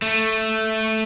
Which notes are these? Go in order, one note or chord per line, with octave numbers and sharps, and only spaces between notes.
A3